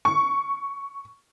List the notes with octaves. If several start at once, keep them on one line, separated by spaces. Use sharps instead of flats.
C#6